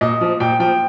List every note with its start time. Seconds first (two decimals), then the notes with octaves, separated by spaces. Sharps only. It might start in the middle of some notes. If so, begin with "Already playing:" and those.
0.01 A#2 D#5
0.21 F3
0.40 A#2 G5
0.60 F3 G5